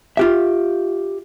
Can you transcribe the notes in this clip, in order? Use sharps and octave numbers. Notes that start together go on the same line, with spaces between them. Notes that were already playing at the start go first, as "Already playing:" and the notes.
F4 G4 E5